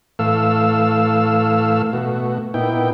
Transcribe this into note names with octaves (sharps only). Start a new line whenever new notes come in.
A2 E3 A3 A4 F5 E6
B2 A3 F#4
A#2 B3 D#4 E4 G5